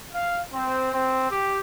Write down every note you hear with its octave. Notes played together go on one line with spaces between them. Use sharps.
F5
C4
C4
G4